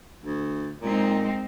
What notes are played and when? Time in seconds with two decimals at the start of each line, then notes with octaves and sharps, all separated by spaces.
0.24 D2
0.82 A#2 G#3 C4 D#4